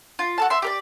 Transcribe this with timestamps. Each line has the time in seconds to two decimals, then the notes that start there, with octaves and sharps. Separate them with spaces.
0.19 F4
0.38 F#4 A4 A5
0.50 E5 C6
0.62 G4 A#4 D5